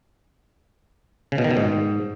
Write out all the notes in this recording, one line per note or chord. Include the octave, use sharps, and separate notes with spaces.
C#3
B2
D#3
B2
G#2